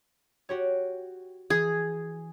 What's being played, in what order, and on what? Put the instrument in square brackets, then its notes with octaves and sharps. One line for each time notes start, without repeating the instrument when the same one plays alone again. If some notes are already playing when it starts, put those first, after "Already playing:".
[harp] F#4 G4 C#5
[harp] E3 [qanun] G#4